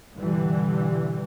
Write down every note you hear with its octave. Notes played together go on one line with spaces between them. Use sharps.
G2 B2 D3 E3 G3